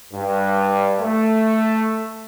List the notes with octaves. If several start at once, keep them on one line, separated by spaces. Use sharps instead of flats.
G2
A3